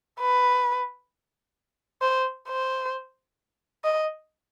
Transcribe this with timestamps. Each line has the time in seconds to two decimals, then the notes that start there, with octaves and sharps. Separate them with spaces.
0.20 B4
2.02 C5
2.48 C5
3.84 D#5